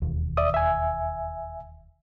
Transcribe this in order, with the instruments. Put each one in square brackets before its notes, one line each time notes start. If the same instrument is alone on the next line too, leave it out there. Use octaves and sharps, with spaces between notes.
[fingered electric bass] E1 D#2
[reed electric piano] D5 E5 D#6
E5 G#5